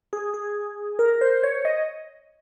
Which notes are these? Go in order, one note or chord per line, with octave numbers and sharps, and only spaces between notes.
G#4
G#4
A#4
C5
C#5
D#5